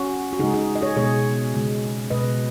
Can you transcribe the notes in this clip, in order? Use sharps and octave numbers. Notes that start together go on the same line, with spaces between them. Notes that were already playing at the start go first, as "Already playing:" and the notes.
Already playing: C#4 F#4
F#4
C#3 G#3 D#4 G#4
D#4 G#4
D#5
G#4 C#5
B2 G#3 G#4 C#5
C#3 G#3
B2 G#3 B4 D#5